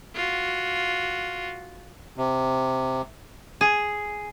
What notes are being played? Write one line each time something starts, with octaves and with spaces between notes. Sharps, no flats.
F4 F#4
C3
G#4